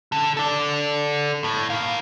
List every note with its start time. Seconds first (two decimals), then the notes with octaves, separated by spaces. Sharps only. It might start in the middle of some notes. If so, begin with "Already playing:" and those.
0.12 D3
0.37 A4 D5
1.44 A2
1.70 D#4 F5